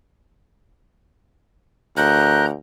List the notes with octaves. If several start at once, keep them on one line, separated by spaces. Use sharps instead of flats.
D2 A#4 A#5 F#6 G6